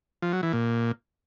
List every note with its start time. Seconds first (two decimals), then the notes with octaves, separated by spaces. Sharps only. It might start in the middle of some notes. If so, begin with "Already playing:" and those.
0.22 F3
0.33 F#3
0.43 E3
0.53 A#2